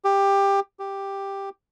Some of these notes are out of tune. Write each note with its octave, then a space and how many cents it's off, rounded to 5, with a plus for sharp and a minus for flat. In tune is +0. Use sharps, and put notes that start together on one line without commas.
G4 +15
G4 +5